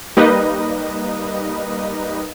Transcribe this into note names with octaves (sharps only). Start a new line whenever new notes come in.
G3 A#3 D#4 B4 D#5